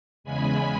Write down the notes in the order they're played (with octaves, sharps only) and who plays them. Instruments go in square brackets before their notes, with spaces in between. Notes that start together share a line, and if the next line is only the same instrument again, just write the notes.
[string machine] E2 C#3 G#3 G#5 B5